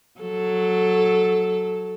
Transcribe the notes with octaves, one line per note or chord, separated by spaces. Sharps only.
F#3 A4